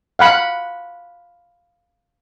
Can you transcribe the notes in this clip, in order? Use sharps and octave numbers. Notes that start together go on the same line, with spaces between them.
F5 F#5 B5